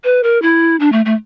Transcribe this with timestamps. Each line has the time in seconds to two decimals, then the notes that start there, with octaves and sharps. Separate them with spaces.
0.04 B4
0.23 A#4
0.42 E4
0.80 D4
0.92 A3
1.06 A3